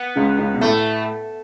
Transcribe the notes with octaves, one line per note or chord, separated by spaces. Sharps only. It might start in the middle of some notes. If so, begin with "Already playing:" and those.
Already playing: B3
C#2 C#3
C#2 C#3
B2
A2 A3